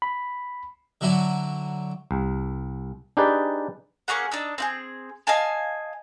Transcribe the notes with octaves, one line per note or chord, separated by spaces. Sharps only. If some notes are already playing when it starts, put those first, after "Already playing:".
B5
D3 F#3 E4 F#4
C2
D4 D#4 G4 G#4 B4 D5
A#3 C#4 G#4 F#5
D4 D#4 E6
C4 E4 G#4
D#5 F5 G#5 A5